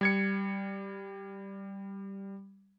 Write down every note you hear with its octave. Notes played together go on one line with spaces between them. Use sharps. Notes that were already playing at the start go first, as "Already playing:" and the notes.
G3 G#6 C#7